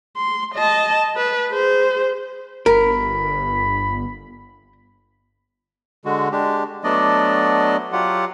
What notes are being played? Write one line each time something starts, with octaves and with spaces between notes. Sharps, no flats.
C6
D#5 A5
B4
G#4 C5
G1 A#4 B5
D3 G#3 F#4
G#3 D4 G4
F#3 A3 B3 D4 D5 D#5
F#3 F4 G4 F#5